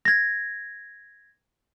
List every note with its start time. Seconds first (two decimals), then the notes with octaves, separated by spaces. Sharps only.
0.05 G#6 A#6